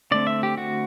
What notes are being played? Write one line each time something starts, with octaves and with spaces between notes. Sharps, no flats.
D3 A3 C4 D5
E5
G4
F#4